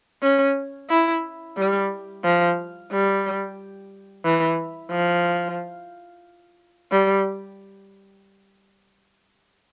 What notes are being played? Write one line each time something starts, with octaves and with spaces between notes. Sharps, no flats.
C#4
E4
G3
F3
G3
E3
F3
G3